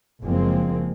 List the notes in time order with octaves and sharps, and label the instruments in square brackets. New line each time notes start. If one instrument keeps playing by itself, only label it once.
[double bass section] F#1 F3 G#3 A#3 C4